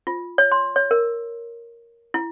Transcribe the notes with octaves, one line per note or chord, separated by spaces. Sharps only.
F4
C#5
C6
C#5
A#4
E4